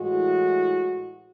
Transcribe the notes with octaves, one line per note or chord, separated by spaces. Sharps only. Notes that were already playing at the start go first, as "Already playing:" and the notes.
Already playing: A2 E3 G#3 F#4